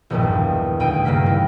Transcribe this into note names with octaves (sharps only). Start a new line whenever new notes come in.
E1 A#1 E2 G2 A#2 D#3
D2 B2 G5 G#5 D#7
G2 C#3 A#3 B6
D#3 E3 E4 A#4